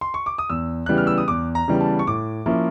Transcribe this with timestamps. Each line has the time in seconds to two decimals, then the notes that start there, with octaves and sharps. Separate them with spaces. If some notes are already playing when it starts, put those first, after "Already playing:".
0.01 C6
0.14 C#6
0.26 D6
0.38 D#6
0.50 E2 E6
0.86 C#3 E3 G3 B3 F#6
0.98 F6
1.07 E6
1.18 D#6
1.28 E2 D6
1.55 A#5
1.68 C#3 E3 G3 B3
1.81 A5
1.99 C#6
2.07 A2 D6
2.46 F3 A#3 C#4 E4